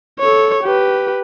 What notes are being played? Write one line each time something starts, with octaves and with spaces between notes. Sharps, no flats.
A4 C#5
G4 B4